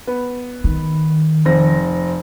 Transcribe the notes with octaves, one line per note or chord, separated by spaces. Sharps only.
B3
D#3
F1 C4 A#6